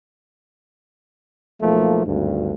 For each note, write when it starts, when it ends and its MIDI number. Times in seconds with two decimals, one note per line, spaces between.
1.62 2.02 35
1.62 2.02 53
1.62 2.02 57
1.62 2.02 58
2.06 2.53 32
2.06 2.53 38
2.06 2.53 43